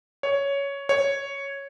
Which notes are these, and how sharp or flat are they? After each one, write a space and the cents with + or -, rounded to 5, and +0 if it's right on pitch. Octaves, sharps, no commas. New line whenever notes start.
C#5 +10
C#5 +0